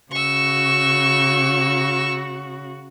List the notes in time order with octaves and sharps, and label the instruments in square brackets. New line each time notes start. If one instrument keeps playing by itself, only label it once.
[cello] C#3 F#4 [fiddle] C#6 E6